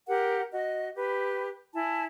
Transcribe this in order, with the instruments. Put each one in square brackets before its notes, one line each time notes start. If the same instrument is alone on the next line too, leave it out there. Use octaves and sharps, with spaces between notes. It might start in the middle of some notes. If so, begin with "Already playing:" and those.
[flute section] G4 A#4 F#5
F#4 D#5
G4 B4
E4 G#5 A5